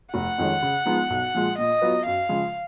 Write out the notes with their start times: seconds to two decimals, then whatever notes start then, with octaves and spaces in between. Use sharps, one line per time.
0.14 F1 F#5
0.38 F2 D#3 G#3 C#4
0.62 C#3
0.86 F3 G#3 B3 D#4
1.10 B1
1.34 A#2 F3 G#3
1.58 A#2 D#5
1.82 F#3 B3 F4 B4
2.06 F#2 F5
2.29 C#3 F3 G#3